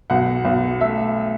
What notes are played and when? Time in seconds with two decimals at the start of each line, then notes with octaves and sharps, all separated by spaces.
0.10 B1 F#5
0.45 B1
0.81 A3 E5